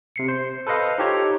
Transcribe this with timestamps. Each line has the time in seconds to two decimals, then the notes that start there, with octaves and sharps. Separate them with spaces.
0.16 C3 C7 C#7
0.28 C5
0.67 A4 B4 C5 D#5 F5
0.98 D#4 F4 G4 A4 C#5 A#5